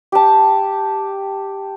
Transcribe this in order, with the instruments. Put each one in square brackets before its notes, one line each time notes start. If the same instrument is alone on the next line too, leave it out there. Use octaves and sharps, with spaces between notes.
[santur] G4 A5